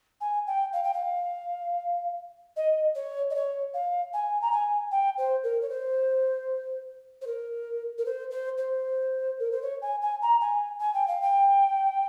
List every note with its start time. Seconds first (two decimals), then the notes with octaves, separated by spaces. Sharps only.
0.21 G#5
0.47 G5
0.73 F5
0.83 G5
0.93 F5
2.56 D#5
2.95 C#5
3.30 D#5
3.34 C#5
3.74 F5
4.13 G#5
4.41 A#5
4.52 G#5
4.91 G5
5.18 C5
5.43 A#4
5.61 C#5
5.69 C5
7.21 C5
7.27 A#4
7.98 A#4
8.05 C5
8.31 C5
8.57 C5
9.39 A#4
9.51 C5
9.62 C#5
9.82 G#5
10.01 G#5
10.22 A#5
10.41 G#5
10.80 G#5
10.94 G5
11.08 F5
11.22 G5